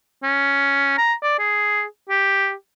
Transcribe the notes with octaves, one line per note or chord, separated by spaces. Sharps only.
C#4
A#5
D5
G#4
G4